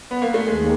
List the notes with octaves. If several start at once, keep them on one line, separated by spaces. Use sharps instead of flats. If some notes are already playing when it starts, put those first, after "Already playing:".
B3
A#3
A3
D#2 G#3